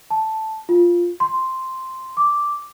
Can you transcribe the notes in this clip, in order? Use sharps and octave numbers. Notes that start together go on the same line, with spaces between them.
A5
F4
C6
D6